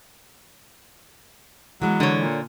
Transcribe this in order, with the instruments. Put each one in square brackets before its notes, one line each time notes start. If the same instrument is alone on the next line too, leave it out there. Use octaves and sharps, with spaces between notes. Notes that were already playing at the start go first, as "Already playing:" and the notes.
[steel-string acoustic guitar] E3 G#3 B3 [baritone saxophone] F#3
[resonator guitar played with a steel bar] D3 C#5
[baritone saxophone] A#2